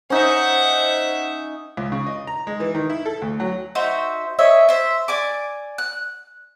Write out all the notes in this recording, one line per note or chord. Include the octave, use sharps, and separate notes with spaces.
C#4 D#4 C5 E5 F#5
C#2
C#3
D#5
A#5
G#3
E3
D#3
E4
A4
D2
F#3
D#4 F#4 C5 E5
E4 C#5 D#5 E5
C5 E5
D5 G#5 D6
F#6